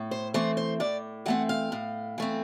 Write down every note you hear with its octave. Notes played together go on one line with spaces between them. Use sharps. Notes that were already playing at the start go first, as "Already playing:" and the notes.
Already playing: A2
C5
E3 A3 C4 C5
C5
A2 D5
E3 A3 C4 F#5
F5
A2
E3 A3 C4